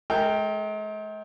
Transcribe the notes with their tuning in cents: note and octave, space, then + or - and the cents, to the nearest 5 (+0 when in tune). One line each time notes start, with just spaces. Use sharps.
G#3 +45 A#4 -25 G5 +0